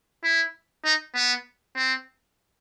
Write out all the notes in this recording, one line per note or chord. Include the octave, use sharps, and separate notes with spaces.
E4
D#4
B3
C4